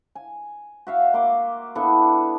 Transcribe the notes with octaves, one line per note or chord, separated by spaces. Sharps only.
G#5
F#4 E5 F5
A#3 C6 D6
B3 D4 E4 A4